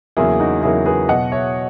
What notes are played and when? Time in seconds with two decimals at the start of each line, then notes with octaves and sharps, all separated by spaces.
0.17 E2 C#3 F#3 A#3 E4 G#4
0.40 D#4 F#4
0.63 E2 C#3 F#3 A#3 E4 G#4
0.85 G#4 B4
1.09 B2 F#3 B3 D#5 F#5
1.32 C#5 E5